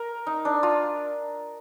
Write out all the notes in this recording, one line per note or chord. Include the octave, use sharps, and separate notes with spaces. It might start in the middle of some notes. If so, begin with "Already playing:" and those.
Already playing: A#4
D#4
D4
F4